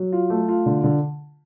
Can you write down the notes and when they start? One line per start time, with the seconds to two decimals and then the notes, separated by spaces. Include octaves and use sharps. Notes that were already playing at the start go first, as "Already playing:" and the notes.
Already playing: F#3
0.12 F4
0.30 A3
0.49 F4
0.66 D3
0.84 D3